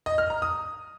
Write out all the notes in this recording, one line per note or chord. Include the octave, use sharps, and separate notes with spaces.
D#5
F6
A#5
D#6